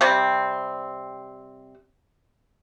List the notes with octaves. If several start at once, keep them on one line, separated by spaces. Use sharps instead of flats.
C3 G3 C4